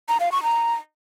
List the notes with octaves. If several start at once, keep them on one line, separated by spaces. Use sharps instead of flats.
A#5
F5
C#6
A#5